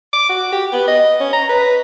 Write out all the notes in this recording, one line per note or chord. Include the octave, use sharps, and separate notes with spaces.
D6
F#4
G4
B3
D#5
C#4
A#5
B4